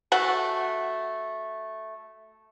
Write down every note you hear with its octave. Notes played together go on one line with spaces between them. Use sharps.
A3 F#4 F#5